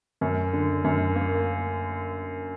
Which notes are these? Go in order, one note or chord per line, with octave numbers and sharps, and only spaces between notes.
F#2
D3
F#2
A#3